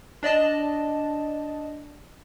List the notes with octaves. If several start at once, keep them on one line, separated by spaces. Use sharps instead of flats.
D4 D5 D#5 A5